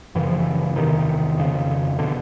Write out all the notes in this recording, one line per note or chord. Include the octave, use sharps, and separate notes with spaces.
F#2 C#3 E3
F3
E3
E2 C3 D#3
F2 C#3
B2 D3